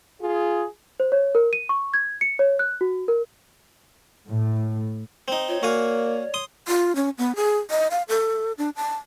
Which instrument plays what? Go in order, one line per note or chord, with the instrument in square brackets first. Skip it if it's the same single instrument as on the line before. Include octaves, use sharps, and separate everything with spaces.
[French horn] F4 [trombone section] G#4
[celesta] C5
C#5
A#4
D#7
C#6
G#6
C#7
C#5
F#6
F#4
A#4
[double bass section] A2
[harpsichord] C4 D#4
[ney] F4 [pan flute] C#5
[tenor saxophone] A#3 [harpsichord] F#4 F5 G#5 [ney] D5
[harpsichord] C6 D#6
[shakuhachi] F4
C#4
B3
G#4
D#5
F5
A4
D4
A5